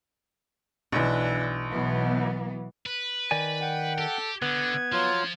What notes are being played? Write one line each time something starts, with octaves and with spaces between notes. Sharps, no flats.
B1 E3 D4
B2 E3 F#3 B3
B4
D#3 D5 G#5
F#5 G5
G4 A4
D3 B3 D6 G#6
F3 F#3 F4 F6